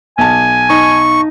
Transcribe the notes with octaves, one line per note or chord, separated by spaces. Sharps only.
B1 G#5 A5
D#4 C#6